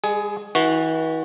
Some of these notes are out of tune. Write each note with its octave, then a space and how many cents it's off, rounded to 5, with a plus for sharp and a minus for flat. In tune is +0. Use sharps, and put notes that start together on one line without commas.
G#3 -40 G#4 +15
E3 -40 F#4 -10